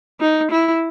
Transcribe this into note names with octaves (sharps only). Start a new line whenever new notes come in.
D#4
E4